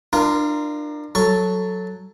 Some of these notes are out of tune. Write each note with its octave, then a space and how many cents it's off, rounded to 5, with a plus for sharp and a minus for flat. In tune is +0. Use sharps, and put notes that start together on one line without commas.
D4 +30 F4 -25 A#4 +0
F#3 +0 A4 +0 C#6 +0